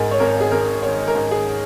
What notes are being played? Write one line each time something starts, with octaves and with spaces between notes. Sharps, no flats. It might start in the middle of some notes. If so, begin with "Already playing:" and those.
Already playing: G#2 A#4
C#5
G#1 A#4
G#4
G#1 A#4
D#3 C#5
A#4
G#2
G#4